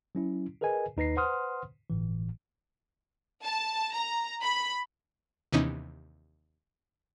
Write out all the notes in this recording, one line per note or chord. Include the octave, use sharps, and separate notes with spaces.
F#3 C#4 E4
G#4 A#4 B4 D#5 G#5
D#2 D#4 B4 A#6 C7
B4 C5 F#5 C6 D#6 F6
G1 A2 E3
A5
A#5
B5
D#2 C3 E3 B3 C#4 D#4